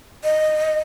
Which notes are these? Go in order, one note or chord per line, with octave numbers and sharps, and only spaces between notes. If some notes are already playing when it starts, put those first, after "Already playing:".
D#5